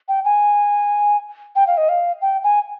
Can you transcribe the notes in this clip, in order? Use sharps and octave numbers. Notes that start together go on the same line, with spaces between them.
G5
G#5
G5
F5
D#5
F5
G5
G#5